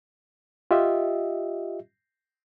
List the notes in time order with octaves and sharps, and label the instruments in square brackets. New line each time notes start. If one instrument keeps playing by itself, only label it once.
[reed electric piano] F4 G4 D#5 E5